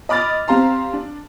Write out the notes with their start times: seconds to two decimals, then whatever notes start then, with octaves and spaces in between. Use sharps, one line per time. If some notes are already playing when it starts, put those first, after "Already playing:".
0.09 D#5 B5 D6 F6 A6
0.48 C4 G4 F5 A#5 C6
0.93 D4